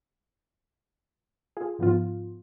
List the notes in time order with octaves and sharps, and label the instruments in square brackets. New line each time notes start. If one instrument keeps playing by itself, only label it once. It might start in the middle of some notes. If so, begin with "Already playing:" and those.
[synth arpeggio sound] F4 G#4
G#2 F3 B3 F4